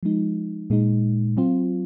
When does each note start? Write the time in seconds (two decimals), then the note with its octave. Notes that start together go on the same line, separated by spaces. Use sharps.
0.03 F3 G#3 D#4
0.70 A#2 G#3 D#4
1.37 F#3 C4 F4